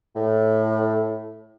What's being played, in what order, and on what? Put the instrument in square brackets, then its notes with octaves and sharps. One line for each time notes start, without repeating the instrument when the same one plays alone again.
[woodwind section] A2